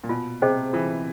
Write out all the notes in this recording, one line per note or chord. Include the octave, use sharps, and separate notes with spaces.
A#2
B2 F4
C3 G#4 C5 D#5 G5
E3 F4